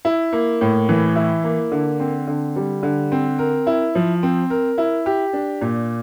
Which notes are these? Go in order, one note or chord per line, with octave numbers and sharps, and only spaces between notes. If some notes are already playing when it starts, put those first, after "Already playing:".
E4
A#3
A2
E3
E4
A#3
D3
C4
D3
G3
D3
C4
A#4
E4
F3
C4
A#4
E4
G4
D4
A#2